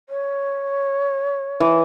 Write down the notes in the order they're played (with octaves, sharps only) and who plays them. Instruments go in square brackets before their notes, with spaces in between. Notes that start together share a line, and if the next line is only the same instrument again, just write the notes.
[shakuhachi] C#5
[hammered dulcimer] E3